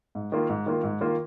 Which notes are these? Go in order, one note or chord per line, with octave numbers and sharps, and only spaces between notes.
G#2
D#3 A#3 F4
G#2
D#3 A#3 F4
G#2
D#3 A#3 F4